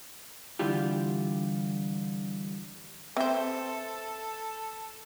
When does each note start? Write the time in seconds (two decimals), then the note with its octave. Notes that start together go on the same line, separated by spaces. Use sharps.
0.59 D3 E3 G3 F4 G4
3.17 C4 A4 B4 C5 E5